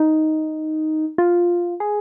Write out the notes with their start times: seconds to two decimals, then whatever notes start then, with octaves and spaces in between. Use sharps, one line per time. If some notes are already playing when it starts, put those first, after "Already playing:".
Already playing: D#4
1.18 F4
1.80 G#4